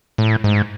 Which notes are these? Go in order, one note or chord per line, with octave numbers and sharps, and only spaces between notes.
A2
G#2